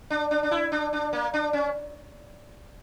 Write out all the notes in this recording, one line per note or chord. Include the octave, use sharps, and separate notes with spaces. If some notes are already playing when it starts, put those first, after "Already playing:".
D4
D4
D4
E4
D4
D4
A#3
D4
C#4